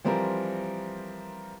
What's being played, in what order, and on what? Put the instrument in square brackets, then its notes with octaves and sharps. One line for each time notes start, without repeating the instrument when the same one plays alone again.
[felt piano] E3 F3 G3 C4 A#4